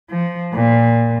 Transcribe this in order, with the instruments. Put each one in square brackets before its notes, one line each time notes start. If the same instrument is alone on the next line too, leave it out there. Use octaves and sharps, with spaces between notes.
[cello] F3
A#2